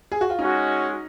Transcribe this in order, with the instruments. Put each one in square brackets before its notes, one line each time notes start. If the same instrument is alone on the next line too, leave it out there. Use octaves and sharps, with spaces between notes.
[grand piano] G#4
F#4
F4
[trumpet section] G#3 C#4 F#4 [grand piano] D#4